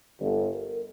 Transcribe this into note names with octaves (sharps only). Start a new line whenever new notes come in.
G1
A#4